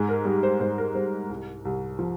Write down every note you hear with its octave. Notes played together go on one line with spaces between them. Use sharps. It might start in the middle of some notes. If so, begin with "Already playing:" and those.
Already playing: G#2 G#4
A#4
G3
C5
G#2 C5
A#4
G3 C5
C2
C2
F3